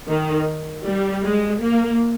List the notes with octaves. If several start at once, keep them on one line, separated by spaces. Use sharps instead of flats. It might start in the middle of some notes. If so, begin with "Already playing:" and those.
D#3
G3
G#3
A#3